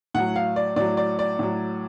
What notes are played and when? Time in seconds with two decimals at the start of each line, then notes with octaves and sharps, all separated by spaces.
0.14 A2 F#3 F#5
0.36 F5
0.56 D5
0.76 A2 F#3 D5
0.97 D5
1.19 D5
1.39 A2 F#3